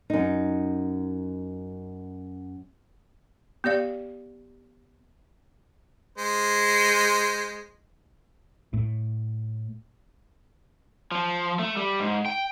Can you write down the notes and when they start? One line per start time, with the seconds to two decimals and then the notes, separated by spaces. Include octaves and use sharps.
0.10 F#2 D#4
3.64 B3 G4 D5 F5
6.18 G#3 C5
8.73 A2
11.12 F3
11.59 A3
11.77 G3
12.00 G#2
12.26 G5